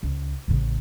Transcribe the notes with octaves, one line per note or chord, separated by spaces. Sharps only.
C#2
A1 C#3